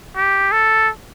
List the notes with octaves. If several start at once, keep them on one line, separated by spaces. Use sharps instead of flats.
G4
A4